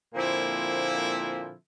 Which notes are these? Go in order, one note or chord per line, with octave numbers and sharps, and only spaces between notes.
A#2 D3 F3 A#3 C4 E4